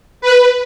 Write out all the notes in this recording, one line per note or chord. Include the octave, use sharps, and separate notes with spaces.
B4